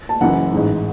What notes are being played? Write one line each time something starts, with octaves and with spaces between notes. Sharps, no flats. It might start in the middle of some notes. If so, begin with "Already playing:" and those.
A5
F#1 F#2 E3 F#5
A1 G#2 E3